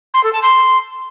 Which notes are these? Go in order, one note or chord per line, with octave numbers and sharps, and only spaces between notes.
C6
A4
A5
C6